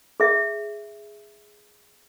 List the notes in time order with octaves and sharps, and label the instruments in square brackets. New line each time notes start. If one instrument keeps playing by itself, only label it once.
[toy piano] G#4 E5